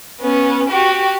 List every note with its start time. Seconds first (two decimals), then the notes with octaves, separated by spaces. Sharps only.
0.20 B3 C#4
0.70 F#4 G4